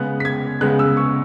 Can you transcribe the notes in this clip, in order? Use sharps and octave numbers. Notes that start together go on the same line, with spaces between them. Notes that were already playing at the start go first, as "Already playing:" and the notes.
Already playing: C#3 G#3 B3 F#6
B6
G#6
C#3 G#3 B3 F#6
E6
C#6